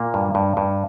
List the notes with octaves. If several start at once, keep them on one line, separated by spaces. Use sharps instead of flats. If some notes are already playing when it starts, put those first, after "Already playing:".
Already playing: A#2 A#3
G2
G2
G2